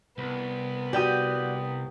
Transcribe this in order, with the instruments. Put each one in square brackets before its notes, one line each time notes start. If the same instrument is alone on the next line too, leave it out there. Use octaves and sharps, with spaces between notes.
[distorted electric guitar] C2 [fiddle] B3
[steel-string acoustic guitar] F#4 D5 [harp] G4 G5 D#6